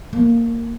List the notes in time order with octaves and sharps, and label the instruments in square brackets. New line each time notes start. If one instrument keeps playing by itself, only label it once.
[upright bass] A#3